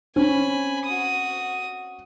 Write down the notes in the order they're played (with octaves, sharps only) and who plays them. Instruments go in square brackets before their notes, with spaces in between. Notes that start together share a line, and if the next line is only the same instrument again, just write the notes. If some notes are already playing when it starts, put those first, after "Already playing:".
[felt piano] C4 C#4 [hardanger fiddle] G#5 B5
[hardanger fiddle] F#4 D#6